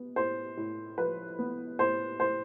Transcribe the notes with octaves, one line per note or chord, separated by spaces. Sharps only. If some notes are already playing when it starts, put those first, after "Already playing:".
Already playing: B3
A2 C5
A2
F3 B4
B3
A2 C5
A2 C5